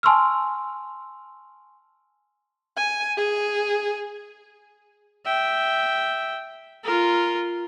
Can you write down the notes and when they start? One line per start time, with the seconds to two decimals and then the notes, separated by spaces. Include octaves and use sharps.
0.03 G#5 A5 C6 C#6 E6 F6
2.77 G#5
3.17 G#4
5.26 E5 G5
6.84 F4 A#4